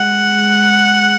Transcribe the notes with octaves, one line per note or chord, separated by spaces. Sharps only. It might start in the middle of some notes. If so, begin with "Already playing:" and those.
Already playing: G#3 F#5